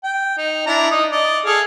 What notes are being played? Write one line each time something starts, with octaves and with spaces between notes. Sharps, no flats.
G5
D#4
D4 E4 A#5
D#4 D#6
D5 D#5
G#4 A4 F5